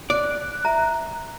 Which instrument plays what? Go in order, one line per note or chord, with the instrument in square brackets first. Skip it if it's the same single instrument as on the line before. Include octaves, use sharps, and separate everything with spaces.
[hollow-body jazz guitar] D5 [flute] F#6
[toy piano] E5 A#5